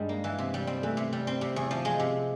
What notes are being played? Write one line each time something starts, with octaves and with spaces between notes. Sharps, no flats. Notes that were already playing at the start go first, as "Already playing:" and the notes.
Already playing: G2 D#3 G3 G#3
A#3
E3
C3
G3
C4
E3 A3
C3
G3
C4
C3
E2
F3
G#3
C3